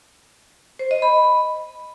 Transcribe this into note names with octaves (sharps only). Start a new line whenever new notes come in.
C5
D#5
B5